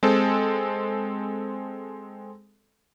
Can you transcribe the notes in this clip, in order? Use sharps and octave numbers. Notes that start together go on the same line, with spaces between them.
G#3 C4 A4